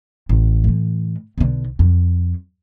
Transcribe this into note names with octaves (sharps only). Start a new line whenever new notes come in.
A1
A2 E3
B1 D3
F2